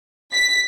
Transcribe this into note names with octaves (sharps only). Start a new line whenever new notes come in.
B6